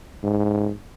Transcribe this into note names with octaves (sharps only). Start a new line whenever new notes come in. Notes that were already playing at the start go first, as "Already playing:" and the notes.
G#2